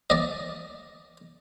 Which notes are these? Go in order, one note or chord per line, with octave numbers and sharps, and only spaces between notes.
D5 D#5